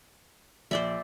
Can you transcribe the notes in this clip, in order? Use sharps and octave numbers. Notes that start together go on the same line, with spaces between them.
A#1 C5 D5 E5